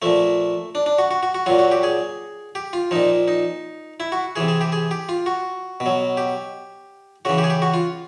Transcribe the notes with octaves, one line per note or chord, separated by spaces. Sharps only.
A#2 F3 A3
D4
D4
F#4
F#4
F#4
F#4
A#2 F#3 F4
F#4
G4
G#4
G4
F4
A#2 F3 D#4
D#4
E4
F#4
C3 E3 G#4
G#4
G4
G#4
G4
F4
F#4
B2
F#3
G4
C#3 E3 F#4
G4
G#4
G4
F#4
F4